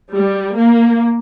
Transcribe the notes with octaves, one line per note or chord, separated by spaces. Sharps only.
G3
A#3